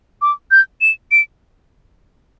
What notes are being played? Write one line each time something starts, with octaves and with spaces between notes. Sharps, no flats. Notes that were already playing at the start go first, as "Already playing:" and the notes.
D6
G6
E7
D7